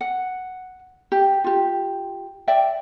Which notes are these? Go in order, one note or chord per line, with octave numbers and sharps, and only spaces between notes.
F#5
G4
F4 G4
D5 E5 G5